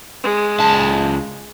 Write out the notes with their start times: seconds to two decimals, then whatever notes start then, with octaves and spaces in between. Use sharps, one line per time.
0.23 G#3
0.60 C#2 A5